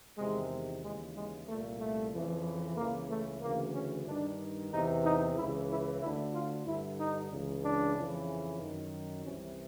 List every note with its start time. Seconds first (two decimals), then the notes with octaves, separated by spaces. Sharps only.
0.18 E2 C3 D#3 G#3
0.83 D#2 C#3 E3 G#3
1.16 G#3
1.47 C2 A#2 A3
1.79 A3
2.12 F2 C#3 E3
2.77 C#2 C#3 E3 A#3
3.10 A3
3.42 D2 C#3 E3 A#3
3.74 C#4
4.06 G2 D#3 D4
4.72 E2 C3 E3 D#4
5.04 D#4
5.36 C#2 C#3 E3 E4
5.69 E4
6.01 D2 D3 E4
6.33 F4
6.65 G2 D3 E4
6.98 D#4
7.30 C#2 C#3 E3
7.63 D4
7.95 F2 C#3 E3
8.60 F#2 D#3
9.25 C2 C3 E3 C#4